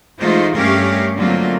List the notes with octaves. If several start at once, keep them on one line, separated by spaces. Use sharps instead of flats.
E3 G#3 A3 D#4 F4 C5
G2 A3 C#4 G4 A#4 F5
D3 F#3 A3 A#3 C4 F4